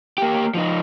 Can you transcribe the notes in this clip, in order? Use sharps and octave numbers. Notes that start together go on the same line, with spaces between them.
A#3 G4
F3 D#4